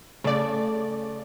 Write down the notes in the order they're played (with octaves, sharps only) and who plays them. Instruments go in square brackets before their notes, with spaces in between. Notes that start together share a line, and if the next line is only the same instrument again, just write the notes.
[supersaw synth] C#3 D5 [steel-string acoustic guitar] A3